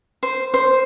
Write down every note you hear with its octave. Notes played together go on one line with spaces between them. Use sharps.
C5
C5